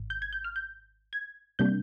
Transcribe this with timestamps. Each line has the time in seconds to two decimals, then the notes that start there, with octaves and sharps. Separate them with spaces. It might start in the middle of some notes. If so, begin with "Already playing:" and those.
Already playing: G#1
0.10 G6
0.22 G#6
0.33 G6
0.44 F6
0.56 G6
1.13 G#6
1.59 C3 G3 A#3 D4 G6